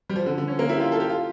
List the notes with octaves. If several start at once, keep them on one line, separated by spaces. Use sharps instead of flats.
G3
F3
D3
D3
C#4
A#3
E4
G4
F4
A4
G4
F4